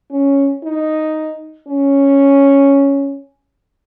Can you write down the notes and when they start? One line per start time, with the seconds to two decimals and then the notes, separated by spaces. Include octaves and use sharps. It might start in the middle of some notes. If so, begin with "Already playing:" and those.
0.10 C#4
0.63 D#4
1.67 C#4